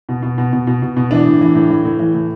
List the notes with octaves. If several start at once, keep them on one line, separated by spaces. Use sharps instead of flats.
B2
B2
B2
B2
B2
B2
B2
E3 D4
A2
E3
A2
E3
A2
E3
A2